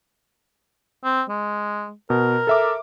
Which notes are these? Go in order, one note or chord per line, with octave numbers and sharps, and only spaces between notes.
C4
G#3
B2 A#4
A4 E5 D6